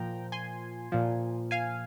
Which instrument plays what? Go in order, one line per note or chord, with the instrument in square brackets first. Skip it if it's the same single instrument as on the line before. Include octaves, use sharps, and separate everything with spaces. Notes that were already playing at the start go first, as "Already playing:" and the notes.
Already playing: [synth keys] A#2 F3 G5 A#5
G#5 C6
A#2 F3
F5 G#5